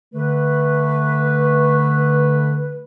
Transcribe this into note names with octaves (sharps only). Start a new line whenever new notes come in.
D3 A3 B4